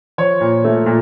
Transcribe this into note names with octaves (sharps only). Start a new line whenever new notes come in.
F3 C#5
A#2
A3
A#2